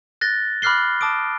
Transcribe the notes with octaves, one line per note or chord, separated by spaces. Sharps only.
F#6 A6 A#6 G7
B5 D6 F6 F#6 C7 G7
A5 D6 D#6 D7